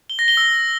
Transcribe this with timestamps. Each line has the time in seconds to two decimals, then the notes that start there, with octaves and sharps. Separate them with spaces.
0.10 G7
0.19 A#6
0.28 G7
0.37 E6